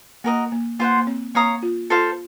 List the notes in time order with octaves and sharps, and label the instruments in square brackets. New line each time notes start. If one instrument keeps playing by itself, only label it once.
[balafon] A#3 [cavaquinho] F#4 A#4 D#5
[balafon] A#3
[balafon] A#3 [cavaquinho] F4 C5 F#5
[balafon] A#3
C4
[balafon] A#3 [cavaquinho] C#5 F5 A#5 D#6
[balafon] F4
[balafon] F4 [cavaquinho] A4 C5 F5